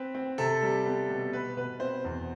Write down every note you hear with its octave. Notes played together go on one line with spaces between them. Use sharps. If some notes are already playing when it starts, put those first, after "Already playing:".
Already playing: C4 B4
C4
C3 A4
G3
B3
B2
B2 B4
B2 B4
C4 C5
E2